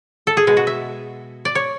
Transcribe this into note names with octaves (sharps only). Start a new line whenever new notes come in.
A4
G#4
B2 G#3
F#4
E5
D5
C#5